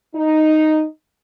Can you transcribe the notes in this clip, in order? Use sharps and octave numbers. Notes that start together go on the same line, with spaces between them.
D#4